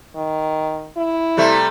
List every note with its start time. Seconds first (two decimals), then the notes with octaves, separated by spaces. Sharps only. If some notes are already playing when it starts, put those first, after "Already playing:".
0.16 D#3
0.97 E4
1.37 C3 G3 A3